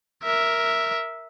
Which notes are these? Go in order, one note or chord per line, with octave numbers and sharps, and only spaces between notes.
A#4 E5